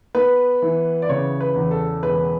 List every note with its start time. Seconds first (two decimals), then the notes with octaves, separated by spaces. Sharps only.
0.15 B3 B4
0.62 E3
1.02 D5
1.09 C#3 C#5
1.40 B4
1.56 E2
1.71 A4
2.03 E1 B4